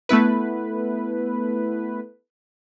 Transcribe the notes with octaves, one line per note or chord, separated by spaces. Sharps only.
A3 B3 E4 B4